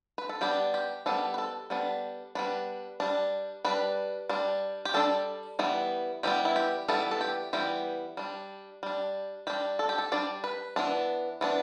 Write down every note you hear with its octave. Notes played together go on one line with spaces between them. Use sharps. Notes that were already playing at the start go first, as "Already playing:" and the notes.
B4
A4
G3 B3 D4 G4
G4
G3 B3 D4 A4
B4
A4
G3 B3 D4
G3 B3 D4 B4
G3 D4
G3 D4 B4
G3 D4
G4
G3 D4 A4
E3 G3 B3
E3 G3 B3 G4
E4
G4
E3 G3 B3 A4
A4
G4
E3 G3 B3 G4
G3 D4
G3 D4
G3 D4 G4
A4
G4
A4
G3 D4 D5
B4
E3 B3 D4
E3 B3 D4